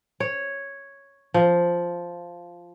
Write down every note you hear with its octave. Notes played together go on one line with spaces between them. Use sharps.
C#5
F3